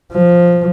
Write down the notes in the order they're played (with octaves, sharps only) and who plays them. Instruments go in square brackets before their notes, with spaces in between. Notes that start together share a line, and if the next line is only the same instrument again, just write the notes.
[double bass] F3